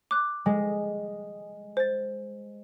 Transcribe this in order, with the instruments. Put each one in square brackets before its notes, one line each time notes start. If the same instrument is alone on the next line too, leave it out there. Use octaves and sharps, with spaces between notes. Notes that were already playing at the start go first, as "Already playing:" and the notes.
[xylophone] D6 F#6
[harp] G#3
[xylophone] C5 A6